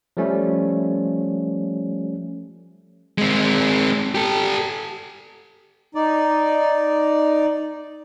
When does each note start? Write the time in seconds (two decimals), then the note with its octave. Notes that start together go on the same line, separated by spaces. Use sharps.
0.17 F3 G3 A3 C#4
3.18 G#3 C4
4.15 G4 A4
5.95 D#4 D5